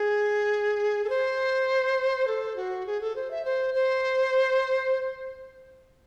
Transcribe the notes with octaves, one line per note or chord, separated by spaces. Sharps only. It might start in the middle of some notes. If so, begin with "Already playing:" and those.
Already playing: G#4
A4
C5
A4
F#4
G#4
A4
C5
E5
C5
C5